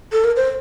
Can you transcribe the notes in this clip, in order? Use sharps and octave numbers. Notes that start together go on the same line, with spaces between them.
A4
A#4
C5